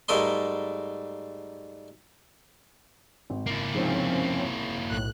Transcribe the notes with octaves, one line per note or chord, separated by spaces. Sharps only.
G#2 G3 A3 A#4 D#5 C6
G#1
A#3 E4
G#2 C3 F3 C4 C#4 D#4
B1 A2 F#6